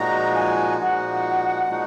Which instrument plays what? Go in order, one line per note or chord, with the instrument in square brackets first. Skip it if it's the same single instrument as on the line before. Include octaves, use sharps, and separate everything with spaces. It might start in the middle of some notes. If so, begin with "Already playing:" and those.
Already playing: [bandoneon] A#2 F3 G#3 D#4 F#4 [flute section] A#5
[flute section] G#5
[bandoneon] A#2 F3 G#3 D#4 F#4 [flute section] F#5
[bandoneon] A#2 F3 G#3 D#4 F#4